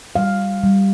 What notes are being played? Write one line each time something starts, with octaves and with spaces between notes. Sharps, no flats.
G3 F5
G3